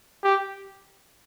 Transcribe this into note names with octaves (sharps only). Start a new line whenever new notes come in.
G4